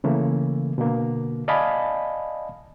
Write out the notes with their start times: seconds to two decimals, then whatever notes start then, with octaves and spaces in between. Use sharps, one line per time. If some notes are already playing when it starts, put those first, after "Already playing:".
0.04 C#3 E3 A3 A#3
0.78 B2 D3 A#3
1.48 D5 D#5 F5 G#5 A5 B5